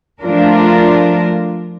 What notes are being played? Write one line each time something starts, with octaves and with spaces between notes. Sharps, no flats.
F3 A3 D4 F4 A#4